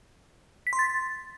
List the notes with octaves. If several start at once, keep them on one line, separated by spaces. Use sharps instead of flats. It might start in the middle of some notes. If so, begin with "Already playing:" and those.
B6
C6
A6